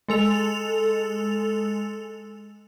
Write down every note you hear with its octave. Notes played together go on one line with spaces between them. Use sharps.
G#3 A4 F7